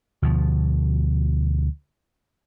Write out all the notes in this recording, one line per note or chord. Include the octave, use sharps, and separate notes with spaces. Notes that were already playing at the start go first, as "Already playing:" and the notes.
D2 B2 F3